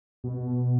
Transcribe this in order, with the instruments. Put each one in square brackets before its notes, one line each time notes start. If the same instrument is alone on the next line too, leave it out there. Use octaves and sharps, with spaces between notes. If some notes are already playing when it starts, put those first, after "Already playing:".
[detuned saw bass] B2